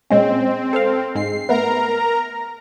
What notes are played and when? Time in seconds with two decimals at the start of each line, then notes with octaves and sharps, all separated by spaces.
0.10 A#2 G#3 C4 C#4
0.73 A4 C5 F5
1.15 G#2 G#3 C7
1.49 A3 B3 A#4 B4 A#5